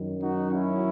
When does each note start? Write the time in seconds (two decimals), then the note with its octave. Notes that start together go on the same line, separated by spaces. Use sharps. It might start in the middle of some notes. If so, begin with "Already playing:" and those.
Already playing: F#2 D#3 F#3
0.20 D#4 F#4
0.51 C#4 E4